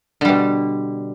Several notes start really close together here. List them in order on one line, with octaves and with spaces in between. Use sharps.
D3 G3 B2